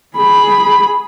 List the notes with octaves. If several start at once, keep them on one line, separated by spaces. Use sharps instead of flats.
G#4 B5